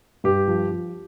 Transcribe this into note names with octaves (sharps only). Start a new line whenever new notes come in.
G2 G4
F3
F3